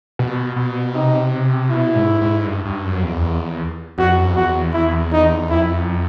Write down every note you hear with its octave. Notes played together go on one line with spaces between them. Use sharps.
B2
B2
C3 D#4
B2 E4
G#2
G#2
G2
G2
F#2
E2
F2
E2
F2 F#4
F#2
F2
E2 F#4
E4
D#4
F2 E4